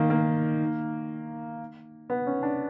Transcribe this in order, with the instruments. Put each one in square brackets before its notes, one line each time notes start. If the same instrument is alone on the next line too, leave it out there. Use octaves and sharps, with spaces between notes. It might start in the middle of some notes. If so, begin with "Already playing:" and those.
Already playing: [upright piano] D#3 A#3
A#3
B3
C#4
D4